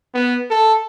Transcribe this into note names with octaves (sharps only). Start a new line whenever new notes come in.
B3
A4